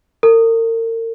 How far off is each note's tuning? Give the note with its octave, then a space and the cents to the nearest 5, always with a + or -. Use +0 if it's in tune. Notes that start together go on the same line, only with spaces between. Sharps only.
A#4 -40